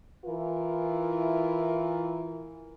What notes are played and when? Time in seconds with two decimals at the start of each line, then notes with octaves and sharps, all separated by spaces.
0.25 E3 E4 F4 A#4